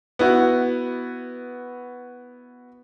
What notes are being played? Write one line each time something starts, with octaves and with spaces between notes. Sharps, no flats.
B3 E4 F#4